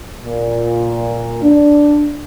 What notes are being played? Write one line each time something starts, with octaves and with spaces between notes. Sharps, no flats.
A#2
D4